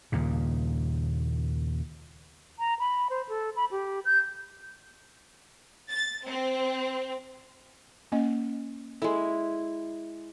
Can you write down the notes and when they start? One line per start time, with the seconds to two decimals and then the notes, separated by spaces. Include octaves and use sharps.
0.12 D#2 A#2 C#3
2.59 A#5
2.79 B5
3.10 C5
3.29 A4
3.56 B5
3.71 G4
4.05 G6
5.91 A6
6.26 C4
8.12 A#3 C#4 D#5
9.02 G#3 E4 A4